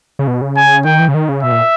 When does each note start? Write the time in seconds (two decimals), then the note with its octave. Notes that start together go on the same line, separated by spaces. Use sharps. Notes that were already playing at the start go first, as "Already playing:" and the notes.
0.19 C#3
0.27 B2
0.41 C#3
0.57 G#5
0.85 D#3 G5
0.99 E3
1.08 C#3
1.14 D#3
1.29 C#3
1.43 B2 E5
1.52 A#2